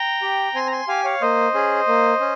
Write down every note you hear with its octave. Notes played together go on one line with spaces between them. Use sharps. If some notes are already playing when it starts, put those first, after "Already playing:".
Already playing: G5 A#5
G4
C4 G#5 C6
A#5
G#5 C6
G4 F5 G#5
C#5 F5
A#3 C5 D#5
C#4 G#4
A#3
C#4